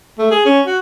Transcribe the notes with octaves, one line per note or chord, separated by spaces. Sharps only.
A3
G#4
C#4
F#4